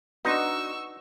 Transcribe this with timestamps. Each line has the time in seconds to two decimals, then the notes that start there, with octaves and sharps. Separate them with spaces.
0.25 D4 D#4 F#4 B4 D#5 C6 C#6 E6